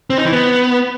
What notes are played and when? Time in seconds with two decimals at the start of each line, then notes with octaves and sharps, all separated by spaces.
0.10 C4
0.18 D#4
0.25 E3
0.33 B3